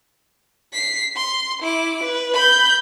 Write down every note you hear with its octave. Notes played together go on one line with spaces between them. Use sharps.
B6 C7
C6
E4 D6
B4
B5 G6